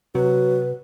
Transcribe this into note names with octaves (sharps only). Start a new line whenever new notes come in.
C3 F#3 B4